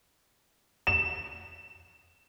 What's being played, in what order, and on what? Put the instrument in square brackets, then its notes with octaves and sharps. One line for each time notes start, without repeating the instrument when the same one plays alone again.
[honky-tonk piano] E7